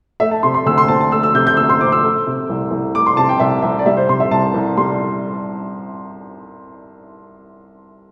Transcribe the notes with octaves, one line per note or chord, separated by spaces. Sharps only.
A3 E5
A5
C3 C6
C6
D2 E6
C6
C4 A5
A5
A3 E6
E6
C3 G6
G6
D2 E6
C6
C4 D6
E6
A3
C3
C2
C2
A3 D6
C6
C3 A5
G5
C2 E5
C2 E5
D5
G3 E5
C5
C3 C6
E5
C2 A5
C2
G3 C6